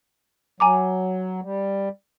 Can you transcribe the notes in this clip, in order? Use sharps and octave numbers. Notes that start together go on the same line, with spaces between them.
F#3 G#5 A#5 D6
G3